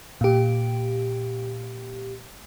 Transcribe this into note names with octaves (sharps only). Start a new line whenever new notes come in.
A#2 G4